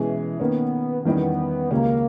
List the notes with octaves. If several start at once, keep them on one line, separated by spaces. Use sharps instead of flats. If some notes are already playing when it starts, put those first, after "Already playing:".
Already playing: B2 E3 G#3 C#4 G#4
D#3 A#3 B3 C#4
E2 D#3 G3 B3 C#4 E4
C#2 C#3 G#3 A#3 C#4 G4